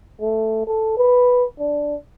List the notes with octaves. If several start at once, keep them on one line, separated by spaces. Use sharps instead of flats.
A3
A4
B4
D4